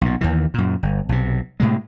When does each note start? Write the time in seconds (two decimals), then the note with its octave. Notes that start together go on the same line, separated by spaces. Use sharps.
0.01 B1 A#2
0.21 D#2 D#3 E3
0.54 F#2 A#2
0.83 G1
1.09 B1 C3
1.60 A2 C3 G#3